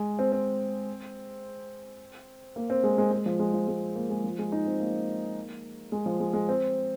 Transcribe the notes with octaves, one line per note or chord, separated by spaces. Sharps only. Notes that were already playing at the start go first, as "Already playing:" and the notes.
Already playing: G#3
C4
C4
A#3
C4
G#3
G#3
G#3
F3
G#3
F3
G#3
A#3
G#3
F3
G#3
D#4
C4
A#3
G#3
F3
G#3
G#3
C4